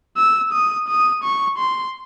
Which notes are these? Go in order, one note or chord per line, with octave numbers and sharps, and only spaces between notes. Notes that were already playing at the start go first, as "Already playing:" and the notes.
E6
D#6
D#6
C#6
C6